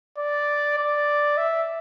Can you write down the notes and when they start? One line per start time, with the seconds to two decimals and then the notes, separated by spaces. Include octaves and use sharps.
0.18 D5
0.78 D5
1.37 E5